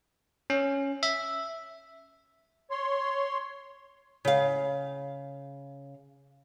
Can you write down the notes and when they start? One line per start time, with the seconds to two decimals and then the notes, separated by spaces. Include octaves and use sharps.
0.50 C#4
1.03 E5
2.71 C#5 C6
4.25 C#3 F5